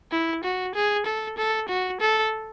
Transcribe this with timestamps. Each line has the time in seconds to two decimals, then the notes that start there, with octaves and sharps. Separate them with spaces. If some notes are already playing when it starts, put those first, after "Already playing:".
0.11 E4
0.44 F#4
0.74 G#4
1.06 A4
1.37 A4
1.68 F#4
2.00 A4